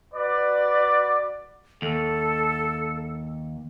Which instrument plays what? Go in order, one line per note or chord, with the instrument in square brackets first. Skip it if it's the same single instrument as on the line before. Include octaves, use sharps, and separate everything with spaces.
[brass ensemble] F#4 B4 D5
[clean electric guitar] D#2 [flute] A4